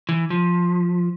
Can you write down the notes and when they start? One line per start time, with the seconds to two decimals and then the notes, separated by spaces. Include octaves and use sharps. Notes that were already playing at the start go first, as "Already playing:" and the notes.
0.09 E3
0.30 F3